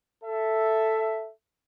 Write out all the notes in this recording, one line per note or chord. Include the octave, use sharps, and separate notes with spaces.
A4 E5